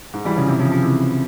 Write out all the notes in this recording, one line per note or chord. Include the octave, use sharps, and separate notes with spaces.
G#2
E3 G3
C#3 F3
C3 E3
C#3 F3
C#3 F3
C3 E3